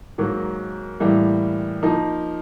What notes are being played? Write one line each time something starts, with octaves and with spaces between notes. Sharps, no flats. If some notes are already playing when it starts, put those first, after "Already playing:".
G#2 D#3 F#3 A#3
A2 E3 G3 A#3
F3 A#3 D#4